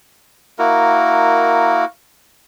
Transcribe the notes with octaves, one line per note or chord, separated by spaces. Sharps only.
A#3 E4 F#4 A#4